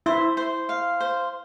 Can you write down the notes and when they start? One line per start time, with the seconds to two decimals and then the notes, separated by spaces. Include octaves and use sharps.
0.06 E4 C5
0.37 C5
0.69 F5
1.00 C5